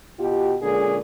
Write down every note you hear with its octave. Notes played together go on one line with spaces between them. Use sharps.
B2 F4 G4
A#2 D3 G#3 C#4 G#4